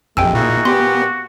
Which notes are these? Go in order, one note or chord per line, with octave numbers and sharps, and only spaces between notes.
A#1 F2 C3 G#3 A3 G5 G#5 E6
A#2 D#4 E4 F#4 G#4
A#2 B3 G4 C6